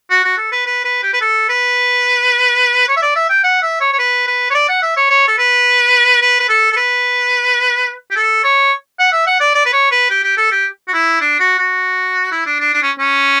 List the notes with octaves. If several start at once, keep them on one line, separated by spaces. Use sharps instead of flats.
F#4
F#4
A4
B4
B4
B4
G4
B4
A4
B4
C#5
E5
D5
E5
G5
F#5
E5
C#5
C#5
B4
B4
C#5
D5
F#5
E5
C#5
C#5
A4
B4
B4
B4
A4
A4
B4
G4
A4
C#5
F#5
E5
F#5
D5
D5
B4
C#5
B4
G4
G4
A4
G4
F#4
E4
D4
F#4
F#4
E4
D4
D4
D4
C#4
C#4